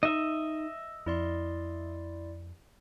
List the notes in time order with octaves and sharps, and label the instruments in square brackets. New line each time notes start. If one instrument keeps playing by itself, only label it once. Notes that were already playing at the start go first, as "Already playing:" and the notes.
[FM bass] D#4 [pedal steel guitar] D#5 E5
[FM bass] F2 [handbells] E4 D5 C6